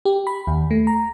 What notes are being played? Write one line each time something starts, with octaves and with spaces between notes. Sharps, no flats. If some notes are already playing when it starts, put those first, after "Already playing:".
G4
B5
D#2
A3
A#5